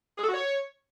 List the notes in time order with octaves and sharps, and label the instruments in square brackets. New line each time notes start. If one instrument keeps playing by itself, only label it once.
[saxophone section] G#4
A4
F#4
C#5